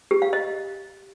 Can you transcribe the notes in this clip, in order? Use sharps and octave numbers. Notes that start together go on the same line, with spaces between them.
G4
F5
D#5